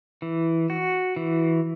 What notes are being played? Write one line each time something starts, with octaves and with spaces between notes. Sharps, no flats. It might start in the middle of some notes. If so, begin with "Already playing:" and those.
E3
F#4
E3